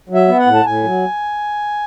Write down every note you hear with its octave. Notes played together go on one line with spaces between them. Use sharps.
F#3
E5
B3
F#5
A2
A5
A2 G#5
F#3